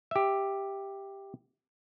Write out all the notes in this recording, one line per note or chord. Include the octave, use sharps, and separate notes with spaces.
G4 E5